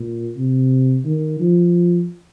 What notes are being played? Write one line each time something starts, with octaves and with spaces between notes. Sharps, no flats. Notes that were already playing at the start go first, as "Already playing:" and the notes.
Already playing: A#2
C3
D#3
F3